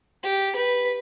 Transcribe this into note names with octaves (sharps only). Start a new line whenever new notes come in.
G4
B4